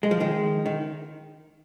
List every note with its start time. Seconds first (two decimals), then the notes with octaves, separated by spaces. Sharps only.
0.03 G#3
0.11 F3
0.20 D#3 G#3
0.66 D#3